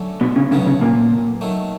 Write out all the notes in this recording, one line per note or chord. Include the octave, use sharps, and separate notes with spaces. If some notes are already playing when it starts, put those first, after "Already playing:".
Already playing: D3 F#3 A3 C#4
B2 B3
C#3 C#4
A2 C#3 F#3 B3 C#4
C#3 C#4
A#2 A#3
D#3 F#3 A3